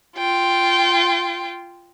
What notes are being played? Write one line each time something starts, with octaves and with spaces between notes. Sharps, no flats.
F4 G5